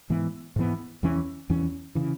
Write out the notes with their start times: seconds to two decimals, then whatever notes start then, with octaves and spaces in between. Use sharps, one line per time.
0.10 G#2 E3 B3
0.56 G#2 E3 B3
1.03 E2 E3 C#4
1.50 E2 E3 C#4
1.95 C#3 E3